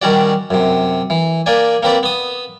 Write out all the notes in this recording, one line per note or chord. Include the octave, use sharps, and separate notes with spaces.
D#3 G3 C#4 F#4 D5
F#2 C3
E3
A#3 D4 D5 G#5
A#3 C4 B4 D5
B3 D#6